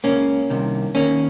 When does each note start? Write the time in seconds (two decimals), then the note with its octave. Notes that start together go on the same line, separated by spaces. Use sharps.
0.04 C#2 C#3 A#3 C#4
0.50 C2 C3 D#3
0.95 D#2 D#3 A#3 C#4